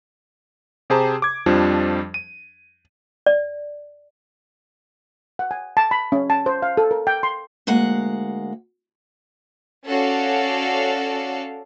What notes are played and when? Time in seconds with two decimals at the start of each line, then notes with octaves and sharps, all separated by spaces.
0.90 C3 G4 G#4 C5 A5 A#5
1.22 D6 G#6
1.46 F2 F3 G3 D4
2.14 D#7
3.26 D5
5.39 F#5
5.51 G#5
5.77 A5
5.91 B5
6.12 C#4
6.30 A5
6.46 C5
6.62 F5
6.77 A4
6.91 A#4
7.07 G5
7.23 C6
7.67 D2 G#3 A#3 F#5
9.87 C#4 F#4 A4 D5 F5